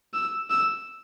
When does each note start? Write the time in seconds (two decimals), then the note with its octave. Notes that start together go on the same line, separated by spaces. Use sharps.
0.14 E6
0.50 E6